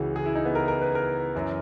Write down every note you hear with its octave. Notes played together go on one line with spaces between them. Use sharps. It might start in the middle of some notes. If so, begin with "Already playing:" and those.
Already playing: C#2 C#3 E3 F#4
G#4
E4
D#4
B3
A#4
A#4
B4
A#4
F#2 E3